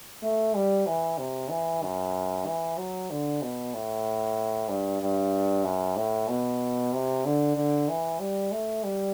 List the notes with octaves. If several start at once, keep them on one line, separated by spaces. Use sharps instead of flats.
A3
G3
E3
C3
E3
F#2
E3
F#3
D3
B2
A2
G2
G2
F#2
A2
B2
C3
D3
D3
E3
G3
A3
G3